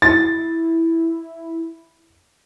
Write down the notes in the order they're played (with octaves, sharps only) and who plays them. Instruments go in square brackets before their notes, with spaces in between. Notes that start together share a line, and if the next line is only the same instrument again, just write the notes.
[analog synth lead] E4 [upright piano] A6